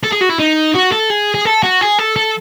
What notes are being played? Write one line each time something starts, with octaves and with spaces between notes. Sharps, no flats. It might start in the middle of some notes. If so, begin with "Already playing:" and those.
A4
G#4
F#4
E4
D#4
F#4
A4
G#4
G#4
A4
F#4
G#4
A4
A4